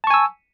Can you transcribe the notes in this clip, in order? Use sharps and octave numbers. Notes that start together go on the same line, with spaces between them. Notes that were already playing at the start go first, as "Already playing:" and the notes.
G#5 A5 C#6 E6